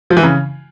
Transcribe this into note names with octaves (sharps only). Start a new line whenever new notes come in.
F3
E3
C#3